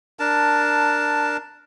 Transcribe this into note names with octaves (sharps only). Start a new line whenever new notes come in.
D4 A#4 A5